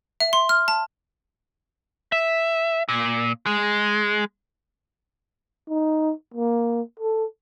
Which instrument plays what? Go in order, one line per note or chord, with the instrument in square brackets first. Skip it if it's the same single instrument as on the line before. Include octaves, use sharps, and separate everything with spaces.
[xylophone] E5
C6
F6
A5
[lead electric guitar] E5
A#2
G#3
[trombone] D#4
A#3
A4